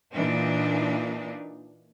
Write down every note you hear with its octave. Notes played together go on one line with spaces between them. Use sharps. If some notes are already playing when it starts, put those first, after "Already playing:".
A#2 E3 D4 D#4